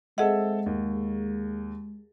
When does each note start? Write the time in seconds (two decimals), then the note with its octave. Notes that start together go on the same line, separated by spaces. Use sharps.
0.18 G#3 C4 G#4 A4 D#5 E5 F#5
0.66 D#2